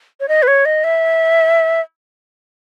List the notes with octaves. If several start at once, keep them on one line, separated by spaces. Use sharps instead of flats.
C#5
D#5
B4
C#5
D#5
E5